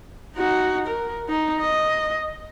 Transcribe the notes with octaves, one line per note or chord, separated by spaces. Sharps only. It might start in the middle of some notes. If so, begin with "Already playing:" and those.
D#4 F#4
A#4
D#4
D#5